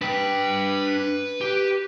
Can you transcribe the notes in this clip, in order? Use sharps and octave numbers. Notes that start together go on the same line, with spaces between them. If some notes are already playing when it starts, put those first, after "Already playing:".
D4 B4 G5
G4